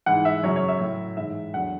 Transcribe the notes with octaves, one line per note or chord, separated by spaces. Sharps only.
G#2 E3 F#5
E5
F#2 C#3 F#3 C#5
C#5
E5
A2 F#3
G#2 E3 E5
E2 D3 F#3 F#5